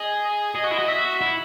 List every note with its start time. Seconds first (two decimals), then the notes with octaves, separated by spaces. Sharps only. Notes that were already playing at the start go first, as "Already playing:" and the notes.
Already playing: G#4 D#5
0.55 G#4 D#5
0.64 F#4
0.71 E4
0.79 F#4
0.88 E5
1.21 E4